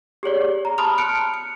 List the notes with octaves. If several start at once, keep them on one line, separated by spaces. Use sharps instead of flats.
G4 G#4 C#5 D5
A#5
A5 B5 C6 D#6 F6 F7
F6 F#6 C#7 D7
C#7